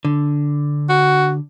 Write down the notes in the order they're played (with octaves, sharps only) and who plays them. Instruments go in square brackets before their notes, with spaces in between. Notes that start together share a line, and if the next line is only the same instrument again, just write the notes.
[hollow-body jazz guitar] D3
[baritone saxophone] F#4